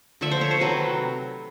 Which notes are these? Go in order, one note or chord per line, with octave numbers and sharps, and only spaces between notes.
D3 F3 A3 E5
C5
C#5
C5
C3 D#3 F#3 B4